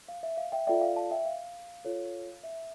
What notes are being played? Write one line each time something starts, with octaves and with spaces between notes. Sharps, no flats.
F5
E5
F5
E5 G5
F4 A4 D5 E5 G5
F5
F5 A5
E5 G5
F5
F4 A4 C#5
E5